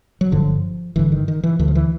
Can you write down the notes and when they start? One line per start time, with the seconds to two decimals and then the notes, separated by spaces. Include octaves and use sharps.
0.21 F#3
0.32 G1 G2 D3 F3
0.96 G1 G2 D3 E3
1.12 D#3
1.28 D#3
1.43 E3
1.59 D2 D3 E3
1.68 F3
1.75 E3